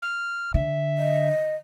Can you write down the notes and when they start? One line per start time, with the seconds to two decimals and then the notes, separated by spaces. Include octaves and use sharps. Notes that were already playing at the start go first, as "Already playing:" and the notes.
0.02 F6
0.54 D3 E5
0.98 D#5